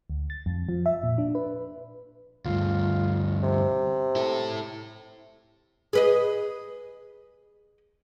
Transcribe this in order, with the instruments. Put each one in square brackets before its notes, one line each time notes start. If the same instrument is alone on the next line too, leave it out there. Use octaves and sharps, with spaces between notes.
[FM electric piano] D2
A6
F2
F3
E5
A#2
D4
B4
[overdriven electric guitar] D2 G2 [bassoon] F4
[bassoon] C3
[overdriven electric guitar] E4 A4
[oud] G#4 B4 D#5